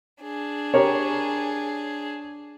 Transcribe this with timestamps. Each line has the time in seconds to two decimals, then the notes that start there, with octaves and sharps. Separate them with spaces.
0.22 D4 G#4
0.74 G4 A#4 C#5